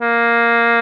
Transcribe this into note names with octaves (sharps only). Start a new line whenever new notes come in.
A#3